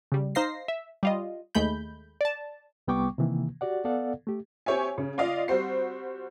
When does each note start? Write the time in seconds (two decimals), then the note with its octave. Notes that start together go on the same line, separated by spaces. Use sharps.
0.12 C#3 G3
0.35 D#4 C5 F5 A#6 C7
0.68 E5
1.03 G3 F4 D#5
1.55 D#2 G#3 A3 B5 G6
2.21 D5 A5
2.88 C2 G3 B3 G5 C#6 D6
3.18 C3 D#3 E3 A#3
3.61 F#4 G4 D5 F#5
3.84 B3 A4 D5 F5 F#5
4.27 A3 G4
4.66 C4 G4 C#5 E5 G#5
4.98 C#3
5.18 F4 D5 D#5 F5
5.48 G3 C4 F#4 C5 C7